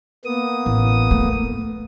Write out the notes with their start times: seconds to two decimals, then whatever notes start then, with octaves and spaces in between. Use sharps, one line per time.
0.25 A#3 B3 D#6
0.66 A1
1.11 A3